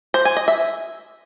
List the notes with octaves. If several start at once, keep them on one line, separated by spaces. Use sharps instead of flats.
C5
G#5
D#5
E5